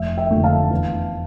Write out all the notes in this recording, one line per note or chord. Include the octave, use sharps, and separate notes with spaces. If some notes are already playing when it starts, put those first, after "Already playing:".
Already playing: F1 E5
E5 G5
F2 D3 A3
F5 A5
E2